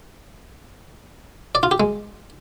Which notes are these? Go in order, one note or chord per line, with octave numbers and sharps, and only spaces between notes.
D5
F4
G4
G#3